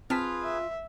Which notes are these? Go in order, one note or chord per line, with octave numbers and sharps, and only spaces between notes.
C4 F4 G#4 B4 A5 B6
E5